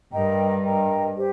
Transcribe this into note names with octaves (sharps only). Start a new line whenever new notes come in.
G2 A#4 D#5 G5 A#5
A#4 D#5 G5 A#5
G4 C5